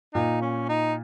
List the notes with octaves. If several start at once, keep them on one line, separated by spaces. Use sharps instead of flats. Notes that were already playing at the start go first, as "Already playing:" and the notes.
A#2 D#4
C#4
D#4